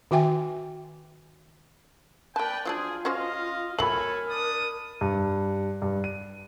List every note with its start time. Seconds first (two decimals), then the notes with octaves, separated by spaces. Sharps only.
0.11 D#3 F#4 E5 G5 G#5
2.36 A#3 B4 D5 G5 A5
2.65 F3 F#3 D4 F4 G#4
3.05 C#4 F#4 C5 D#5 F5
3.79 F#3 A3 A4 A#4 C#5 G#5 B5 F#7
4.28 D4 A5 D#6
5.01 G2
5.82 G2
6.04 D#7